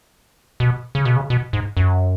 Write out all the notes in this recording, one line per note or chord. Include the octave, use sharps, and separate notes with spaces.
B2
C#3
B2
C#3
B2
G#2
F#2